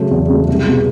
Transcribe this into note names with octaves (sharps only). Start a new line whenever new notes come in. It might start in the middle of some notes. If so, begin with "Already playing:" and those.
Already playing: C#3 F#3 A3
E2
C#3 F#3 A3
C2
B2 G#3